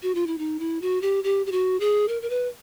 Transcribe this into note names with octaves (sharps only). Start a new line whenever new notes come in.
F#4
F4
E4
D#4
E4
F#4
G4
G4
G4
F#4
G#4
A#4
A#4
B4